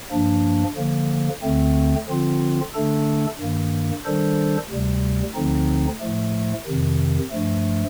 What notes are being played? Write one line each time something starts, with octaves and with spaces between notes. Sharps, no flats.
G2 F3 A#3 D4
D3 F3 A#3
D2 D3 A3 C4
D3 F3 C4 F4
D3 A3 D4 A4
G2 D#3 A#3
D#3 G3 D4 A4 C5
D2 C3 G3
D2 D3 F3 C4 D#4
A2 F3 A3
F2 C3 D#3
G2 F3 A3